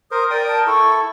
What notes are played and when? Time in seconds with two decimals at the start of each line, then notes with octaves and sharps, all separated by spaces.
0.11 A#4 C5 D#6
0.30 A#4 D5 G5 D#6
0.48 A5
0.67 E4 A4 C#6